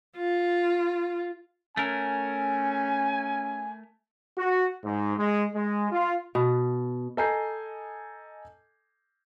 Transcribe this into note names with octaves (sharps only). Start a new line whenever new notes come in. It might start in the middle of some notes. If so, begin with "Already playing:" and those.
F4
A3 C#4 A#4 G#5
F#4
G#2
G#3
G#3
F4
B2
A4 D#5 G#5 A#5 G6 C7